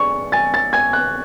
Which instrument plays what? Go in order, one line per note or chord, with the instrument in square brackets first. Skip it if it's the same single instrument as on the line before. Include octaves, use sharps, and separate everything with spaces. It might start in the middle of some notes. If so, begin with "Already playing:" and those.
Already playing: [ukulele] D4 G#4 [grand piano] C#6
[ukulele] G#5 [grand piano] A6
[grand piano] A6
[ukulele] G#5 [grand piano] G#6
[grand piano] F#6